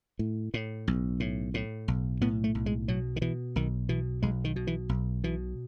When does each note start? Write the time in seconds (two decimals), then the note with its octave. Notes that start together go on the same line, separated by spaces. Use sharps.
0.19 A2
0.54 A2
0.88 B1
1.20 A2
1.54 A2
1.88 B1
2.22 A2 B3
2.44 A3
2.55 B1
2.66 G#3
2.88 B2 F#3
3.16 D#3
3.21 B2 E3
3.56 B1 D#3
3.89 B2 E3
4.22 B1 G#3
4.44 D#3
4.56 B2
4.67 E3
4.89 B1
5.24 B2 E3